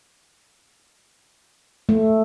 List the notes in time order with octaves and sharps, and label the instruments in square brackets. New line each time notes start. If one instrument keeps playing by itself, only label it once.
[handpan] A3